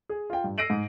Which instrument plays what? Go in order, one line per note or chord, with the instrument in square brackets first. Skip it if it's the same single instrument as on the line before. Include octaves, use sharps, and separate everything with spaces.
[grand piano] G#4
F4 G5
G2
E6 A#6 C7 D7 D#7 F#7
G#2